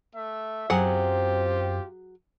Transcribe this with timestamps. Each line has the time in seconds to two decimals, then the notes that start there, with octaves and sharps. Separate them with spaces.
0.14 A3 E5
0.70 F#2 F#3 C4 F4 G4 G#4 F#5